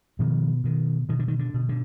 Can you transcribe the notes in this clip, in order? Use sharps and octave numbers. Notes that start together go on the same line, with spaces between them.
B2 D#3 F3
B2 D#3
B2 D#3
D3
D#3
D3
B2
D3